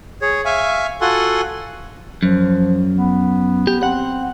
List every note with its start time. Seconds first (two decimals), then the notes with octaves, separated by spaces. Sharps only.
0.22 G#4 C#5
0.45 E5 F5 G#5 C#6
1.01 F4 F#4 A4 F#5 G#5 C6
2.23 F#2 F3
2.96 B3
3.67 G4
3.83 C4 F#5